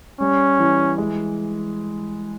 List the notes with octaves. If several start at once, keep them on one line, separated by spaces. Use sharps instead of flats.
G3 C#4
E3
G#3